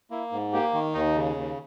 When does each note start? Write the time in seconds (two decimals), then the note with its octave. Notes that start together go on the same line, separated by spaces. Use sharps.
0.11 A#3 E4
0.32 G#2
0.53 A#3 G4
0.73 D#3
0.94 D#2 D#4
1.15 C#3
1.36 D#2